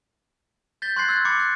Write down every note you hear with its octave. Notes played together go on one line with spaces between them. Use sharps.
G6 A6 B6 G7
C6 C#6 F#6 G#6 A6 C7
E6 F#6 A6
B5 D6 A6 C#7
F#6